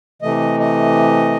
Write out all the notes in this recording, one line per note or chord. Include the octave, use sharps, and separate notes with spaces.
C3 E3 A3 D#5
D#5